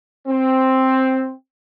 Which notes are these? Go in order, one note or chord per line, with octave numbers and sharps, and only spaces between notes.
C4